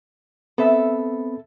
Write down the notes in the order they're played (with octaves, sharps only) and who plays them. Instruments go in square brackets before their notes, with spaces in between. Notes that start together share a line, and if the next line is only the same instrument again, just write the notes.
[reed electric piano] B3 C4 B5 [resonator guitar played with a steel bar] A4 E5